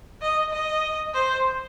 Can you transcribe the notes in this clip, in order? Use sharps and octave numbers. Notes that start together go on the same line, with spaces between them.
D#5
D#5
C5